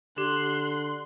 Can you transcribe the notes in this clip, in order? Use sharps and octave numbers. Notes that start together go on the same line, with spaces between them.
D3 G4 C6 F#6